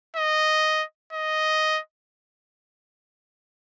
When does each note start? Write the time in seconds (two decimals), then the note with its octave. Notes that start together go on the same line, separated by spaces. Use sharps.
0.16 D#5
1.13 D#5